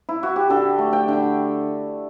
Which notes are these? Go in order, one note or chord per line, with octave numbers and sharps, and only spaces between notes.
E4
F#4
G4
D3 A4
A3
G5
D3